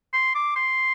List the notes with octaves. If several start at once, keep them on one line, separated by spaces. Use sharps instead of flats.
C6
D6
C6